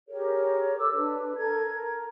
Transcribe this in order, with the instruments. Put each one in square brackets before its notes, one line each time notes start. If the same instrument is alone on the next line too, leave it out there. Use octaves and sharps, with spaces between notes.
[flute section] G4 G#4 A#4 C#5
A4 D6 E6
D4 B4
A4 A#4 G#6
A#4